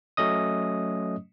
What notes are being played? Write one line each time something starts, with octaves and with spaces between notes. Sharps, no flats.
F#3 A3 C#4 D#5 D#6